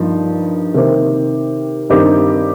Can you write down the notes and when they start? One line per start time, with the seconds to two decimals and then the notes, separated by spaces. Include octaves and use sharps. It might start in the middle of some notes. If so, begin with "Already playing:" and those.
Already playing: G2 F3 A#3 D#4
0.74 C3 D#3 A#3 G4 C5
1.90 G2 D#3 C4 D#4 G4